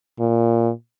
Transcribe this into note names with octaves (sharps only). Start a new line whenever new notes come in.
A#2